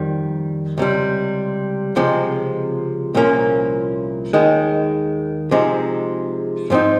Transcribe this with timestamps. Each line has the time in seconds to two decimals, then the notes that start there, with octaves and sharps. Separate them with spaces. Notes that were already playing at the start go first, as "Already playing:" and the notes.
Already playing: F2 D#3 G3
0.78 C#2 C3 G3
1.96 C#2 C3 F3 G#3
3.15 C2 A#2 F3 A#3 C#4
4.33 D#2 D#3 G#3
5.51 C3 F3 G#3 D#4
6.70 G#2 F3 C4 D#4